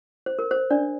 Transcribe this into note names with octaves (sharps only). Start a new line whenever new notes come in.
C5
A#4
C5
D4 D5